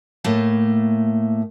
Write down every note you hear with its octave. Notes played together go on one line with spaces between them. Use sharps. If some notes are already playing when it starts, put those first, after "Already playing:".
A2 A3 A#3